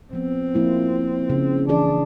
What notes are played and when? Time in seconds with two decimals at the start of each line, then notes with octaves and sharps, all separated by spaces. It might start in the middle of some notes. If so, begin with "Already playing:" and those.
0.13 F3 B3 C4
0.55 F3 A#3 E4
1.30 C#3
1.69 E3 D4 G#4 D5